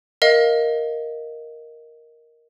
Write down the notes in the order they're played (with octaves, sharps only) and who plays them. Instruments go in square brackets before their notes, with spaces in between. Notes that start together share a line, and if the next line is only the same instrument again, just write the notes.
[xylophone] A#4 D#5 F5